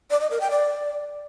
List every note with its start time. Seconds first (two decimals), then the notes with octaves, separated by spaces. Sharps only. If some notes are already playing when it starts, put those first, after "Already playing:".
0.11 D5
0.21 D#5
0.31 A#4
0.41 G5
0.51 D5